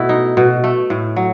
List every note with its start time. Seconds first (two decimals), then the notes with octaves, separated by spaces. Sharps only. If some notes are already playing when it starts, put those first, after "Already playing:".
Already playing: B2 A3 E4
0.09 D#4
0.37 B2
0.64 A3
0.90 A2
1.16 F#3